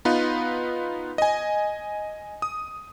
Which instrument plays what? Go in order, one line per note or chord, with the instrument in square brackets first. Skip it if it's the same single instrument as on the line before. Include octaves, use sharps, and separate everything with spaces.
[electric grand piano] B3 D#4 F4 B4
D#5 G#5
D#6